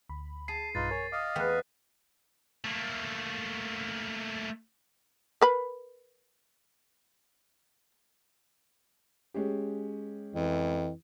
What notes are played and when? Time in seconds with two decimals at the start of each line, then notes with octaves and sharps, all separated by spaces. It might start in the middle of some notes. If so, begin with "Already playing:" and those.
0.09 D2 B5
0.48 G#4 A5 C7 D#7
0.75 B1 G2 D#4 F4 B4 A6
0.91 A#4 C#5 G#5
1.12 D#5 F5 D6 D#6
1.36 E2 A3 B3 G5 F#6 B6
2.64 A3 A#3
5.41 A#4 B4 B5
9.34 G#3 C#4 G4
10.34 F2 E3